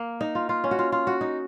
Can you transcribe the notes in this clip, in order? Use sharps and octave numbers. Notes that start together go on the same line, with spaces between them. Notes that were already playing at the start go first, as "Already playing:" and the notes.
Already playing: A#3
D#4
F4
F4
C#4
F#4
F4
F4
F#4
D#4